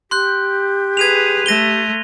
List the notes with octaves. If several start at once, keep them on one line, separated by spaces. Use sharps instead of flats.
G4 C6 F#6 G6
G#4 B4 G#6 D#7 F7
A3 A#6 D#7 G7